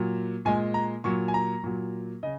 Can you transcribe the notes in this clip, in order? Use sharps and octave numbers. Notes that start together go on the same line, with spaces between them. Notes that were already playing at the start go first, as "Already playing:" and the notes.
Already playing: A#2 F#3
A#2 G#3 G#5
A#5
A#2 F#3 C#6
G#5
A#5
A#2 F#3
C#3 D#5